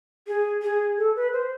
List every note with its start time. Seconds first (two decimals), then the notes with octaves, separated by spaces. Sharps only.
0.27 G#4
0.63 G#4
0.98 A4
1.16 B4
1.33 C5